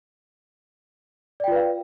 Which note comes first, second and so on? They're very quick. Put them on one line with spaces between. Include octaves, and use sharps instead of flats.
D5 G5 F4 B4 F5